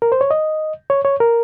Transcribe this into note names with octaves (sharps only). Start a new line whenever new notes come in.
A#4
C5
C#5
D#5
C#5
C#5
A#4